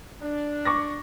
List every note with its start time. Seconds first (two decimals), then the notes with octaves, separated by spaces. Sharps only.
0.22 D4
0.65 C#6 D6 A#6